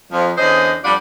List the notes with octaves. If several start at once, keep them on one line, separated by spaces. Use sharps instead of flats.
F2 F3
E2 D3 C#4 C5 D#5
F2 G3 D4 F4 D5 F#5